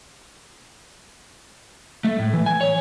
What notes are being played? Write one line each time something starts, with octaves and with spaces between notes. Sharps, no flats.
A3
A2
E3
G#5
C#5